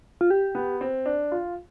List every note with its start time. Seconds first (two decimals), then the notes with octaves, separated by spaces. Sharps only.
0.21 F4
0.30 G4
0.55 B3
0.81 C4
1.06 D4
1.32 F4